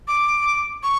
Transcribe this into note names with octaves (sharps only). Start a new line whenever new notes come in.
D6
C#6